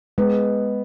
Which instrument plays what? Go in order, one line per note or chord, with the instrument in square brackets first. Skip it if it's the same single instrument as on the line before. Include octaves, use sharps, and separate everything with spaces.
[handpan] G#3 [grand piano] B3